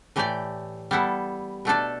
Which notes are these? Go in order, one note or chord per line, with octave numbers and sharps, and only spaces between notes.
A2 E3 A3 G4 D5
G3 B3 E4 A4
B2 A3 D4 A4 D5